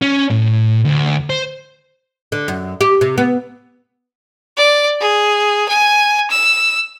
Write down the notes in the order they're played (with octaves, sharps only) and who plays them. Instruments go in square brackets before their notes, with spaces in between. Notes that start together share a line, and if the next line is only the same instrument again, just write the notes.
[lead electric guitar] C#4
A2
D2
C5
[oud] D3
F#2
G4
C3
B3
[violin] D5
G#4
G#5
E6